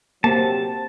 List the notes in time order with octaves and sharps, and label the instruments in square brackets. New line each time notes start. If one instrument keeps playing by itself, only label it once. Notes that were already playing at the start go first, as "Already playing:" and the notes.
[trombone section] C3 F#3 C4 [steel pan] A#3 [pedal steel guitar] A5